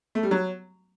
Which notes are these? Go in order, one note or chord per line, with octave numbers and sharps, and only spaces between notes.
A3
G3
F#3